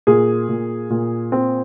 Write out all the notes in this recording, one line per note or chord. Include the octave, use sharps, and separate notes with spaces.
A#2 G#4
A#2
A#2
C4